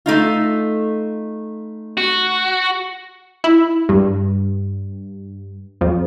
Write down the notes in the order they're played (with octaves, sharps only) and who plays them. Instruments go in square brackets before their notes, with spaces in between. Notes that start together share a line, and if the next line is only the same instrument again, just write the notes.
[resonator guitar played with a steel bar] A3 D#4 F4
[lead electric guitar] F#4
[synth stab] E4
G2
F2